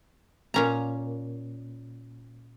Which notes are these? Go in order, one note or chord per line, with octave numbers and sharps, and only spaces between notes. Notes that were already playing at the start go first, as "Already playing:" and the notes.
A#2 C#4 A#5